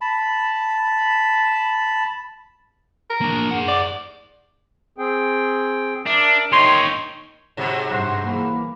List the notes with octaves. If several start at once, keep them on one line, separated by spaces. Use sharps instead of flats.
A5 B5
A#4
A#3 D4
G#4 F#5
D5
C4 G#4 G5
D4 A#4 E5
D#3 D#4 C#5 C6
G#2 C3 F#3
G2 F#4 C5
E3 A#3